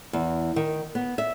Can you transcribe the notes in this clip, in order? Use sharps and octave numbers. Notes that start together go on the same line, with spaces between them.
E2
D#3
B3
E5